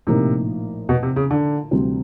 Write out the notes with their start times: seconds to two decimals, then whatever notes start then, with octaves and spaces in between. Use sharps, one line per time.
0.07 A#1 A2 C3 F3 A#3 D#4
0.89 B2
1.03 C3
1.16 C#3
1.31 D3
1.71 D2 C3 E3 G3 C4